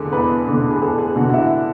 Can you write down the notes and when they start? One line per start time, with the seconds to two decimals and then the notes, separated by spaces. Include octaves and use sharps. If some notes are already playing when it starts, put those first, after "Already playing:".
Already playing: E2 D3 G#4 A4
0.12 E2 B4
0.48 D3
0.70 G#4
0.82 E2 A4
0.98 G#4
1.16 D3 F#4
1.29 F#4
1.34 E4